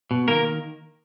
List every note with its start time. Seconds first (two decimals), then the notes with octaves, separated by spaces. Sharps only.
0.11 B2
0.28 D#3 A#3 A#4